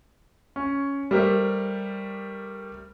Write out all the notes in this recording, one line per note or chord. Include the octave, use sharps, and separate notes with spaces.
C#4
G3 A3 G4 A#4 C5 E5